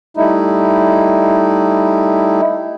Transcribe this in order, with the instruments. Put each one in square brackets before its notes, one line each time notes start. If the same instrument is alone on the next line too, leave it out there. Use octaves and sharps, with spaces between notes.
[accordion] G3 A3 D#4 E4